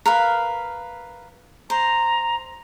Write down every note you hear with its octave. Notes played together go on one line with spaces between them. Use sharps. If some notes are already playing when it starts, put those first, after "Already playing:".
A#4 B4 F5
C5 A#5